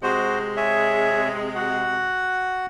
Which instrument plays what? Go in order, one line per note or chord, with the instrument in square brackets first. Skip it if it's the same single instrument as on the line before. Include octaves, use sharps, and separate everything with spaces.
[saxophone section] C3 G#3 [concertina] F#4 C5
[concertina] G#4 C#5 E5
F#4 F#5